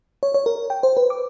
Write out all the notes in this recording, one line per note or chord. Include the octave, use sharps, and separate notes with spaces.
C#5
C#5
A#4
G5
C5
B4
D6